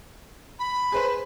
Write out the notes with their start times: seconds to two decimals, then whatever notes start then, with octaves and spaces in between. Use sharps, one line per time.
0.59 B5
0.92 G#4 B4 C5